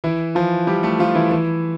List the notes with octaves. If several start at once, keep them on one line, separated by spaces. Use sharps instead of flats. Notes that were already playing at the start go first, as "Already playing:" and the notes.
E3 E4
F3 F4
G3 G4
A3 A4
F3 F4
E3 E4
E3 E4